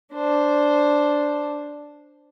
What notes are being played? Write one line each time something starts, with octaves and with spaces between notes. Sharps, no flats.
D4 C5